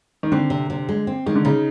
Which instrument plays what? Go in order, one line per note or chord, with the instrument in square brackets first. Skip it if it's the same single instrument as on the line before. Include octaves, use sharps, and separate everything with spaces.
[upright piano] D#3
[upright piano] D3 [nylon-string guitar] C4
[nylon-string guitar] C3
C3
G#3
C4
[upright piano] D#3 [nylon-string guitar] G#3
[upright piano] D3
[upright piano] C#3 [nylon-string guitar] D#4